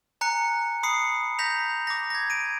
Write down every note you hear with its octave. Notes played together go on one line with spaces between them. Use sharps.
G#5 A#5 F#6 C#7
B5 D#6 C7 C#7
A#5 G6 A#6 B6 F7
D6 A#6
G#6 A#6
D7 D#7